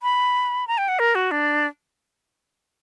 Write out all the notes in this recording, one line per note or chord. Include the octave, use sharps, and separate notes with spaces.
B5
A#5
G5
F#5
A#4
F#4
D4